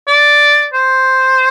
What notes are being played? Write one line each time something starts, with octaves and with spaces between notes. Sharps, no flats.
D5
C5